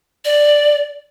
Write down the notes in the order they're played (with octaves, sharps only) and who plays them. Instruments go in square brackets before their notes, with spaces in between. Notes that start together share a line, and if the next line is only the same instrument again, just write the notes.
[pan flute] D5